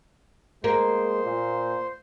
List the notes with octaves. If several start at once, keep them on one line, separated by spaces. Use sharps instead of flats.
G#3 A#3 C5
A#2